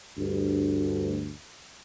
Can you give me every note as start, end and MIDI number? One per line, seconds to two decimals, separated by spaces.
0.18 1.35 38
0.18 1.35 43